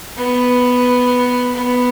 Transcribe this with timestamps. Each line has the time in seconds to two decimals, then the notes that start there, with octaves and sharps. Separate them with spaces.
0.17 B3
1.54 B3